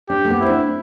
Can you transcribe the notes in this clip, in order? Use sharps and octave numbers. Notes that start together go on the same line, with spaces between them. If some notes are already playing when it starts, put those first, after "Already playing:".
D4 G4
A3
B3
C4 E4
D4